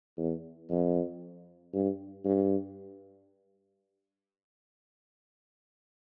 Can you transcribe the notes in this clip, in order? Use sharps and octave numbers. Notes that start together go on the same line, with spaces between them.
E2
F2
G2
G2